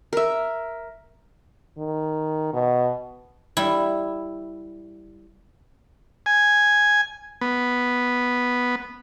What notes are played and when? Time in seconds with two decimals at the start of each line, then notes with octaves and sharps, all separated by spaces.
0.13 A#4 E5
1.77 D#3
2.53 B2
3.57 G3 E4
6.26 G#5
7.41 B3